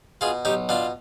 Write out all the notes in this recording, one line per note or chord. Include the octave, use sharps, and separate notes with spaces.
B2 F4 G#4
B1 D#4 G4
B2 D4 F4